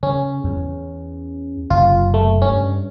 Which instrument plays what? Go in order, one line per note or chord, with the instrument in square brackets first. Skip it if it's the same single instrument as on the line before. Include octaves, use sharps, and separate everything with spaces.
[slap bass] C#3 [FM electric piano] C#4
[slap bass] E2
[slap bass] F#1 C3 [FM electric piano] F4
[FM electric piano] A3
[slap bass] G2 [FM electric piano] C#4